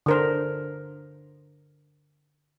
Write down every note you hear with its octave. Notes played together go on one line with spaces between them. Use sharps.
D3 A#4 C5